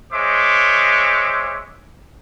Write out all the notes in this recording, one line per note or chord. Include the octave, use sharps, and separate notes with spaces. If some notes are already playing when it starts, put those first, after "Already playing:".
G#3 C5 C#5 E5 D6